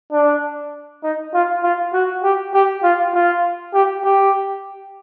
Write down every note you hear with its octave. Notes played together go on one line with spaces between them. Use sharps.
D4
D#4
F4
F4
F#4
G4
G4
F4
F4
G4
G4